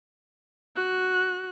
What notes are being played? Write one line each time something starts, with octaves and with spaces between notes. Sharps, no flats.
F#4 F#6